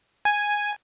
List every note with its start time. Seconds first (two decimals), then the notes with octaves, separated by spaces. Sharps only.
0.25 G#5